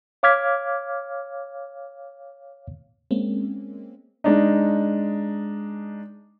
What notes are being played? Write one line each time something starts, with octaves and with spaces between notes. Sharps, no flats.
C#5 F5 D6 F6 G#6 B6
G#3 A#3 C4 C#4
G#3 D4 D#4